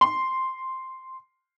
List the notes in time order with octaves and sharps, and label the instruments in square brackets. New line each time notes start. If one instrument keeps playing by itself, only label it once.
[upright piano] C6